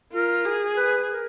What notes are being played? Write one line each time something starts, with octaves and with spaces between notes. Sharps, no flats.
F4 A#4
G#4
B4
A#4